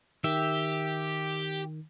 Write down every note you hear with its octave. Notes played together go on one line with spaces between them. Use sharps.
D#3 G4 E5